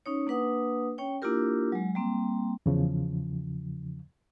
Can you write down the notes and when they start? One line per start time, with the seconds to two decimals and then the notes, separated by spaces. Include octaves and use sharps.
0.06 C#4 D#4 C#5
0.27 A#3 D4 B4 F#5 D#6
0.98 C#4 C#5 G5
1.22 A#3 D4 E4 F4 G4 A#4
1.72 F#3 G#3
1.95 G3 A#3 C4
2.66 E2 C#3 F3